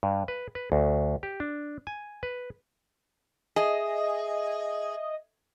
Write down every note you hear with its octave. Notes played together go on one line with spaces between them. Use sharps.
G2
B4
B4
D2
G4
D4
G#5
B4
G#4 D#5 E5 D#6